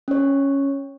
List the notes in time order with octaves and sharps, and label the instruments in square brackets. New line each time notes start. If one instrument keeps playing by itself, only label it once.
[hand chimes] C#4 C#5